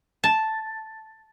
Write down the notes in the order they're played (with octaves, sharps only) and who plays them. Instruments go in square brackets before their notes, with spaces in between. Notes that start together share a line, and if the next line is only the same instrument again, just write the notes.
[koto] A5